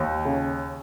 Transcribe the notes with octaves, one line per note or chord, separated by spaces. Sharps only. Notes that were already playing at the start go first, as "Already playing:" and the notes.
Already playing: D#2
C#3